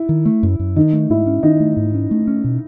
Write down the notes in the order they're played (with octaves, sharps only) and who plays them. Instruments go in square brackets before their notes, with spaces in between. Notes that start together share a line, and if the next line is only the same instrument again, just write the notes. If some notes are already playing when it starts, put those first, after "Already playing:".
Already playing: [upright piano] E4
[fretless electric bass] D#3
A3
F#2
F#2
[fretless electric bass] D#3 [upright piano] D#4
[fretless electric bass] A3
[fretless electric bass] G#2 [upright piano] E4
[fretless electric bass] C#4
[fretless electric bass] D#3 [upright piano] D#4
[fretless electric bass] A3
G#2
C#4
A3
C#4
B2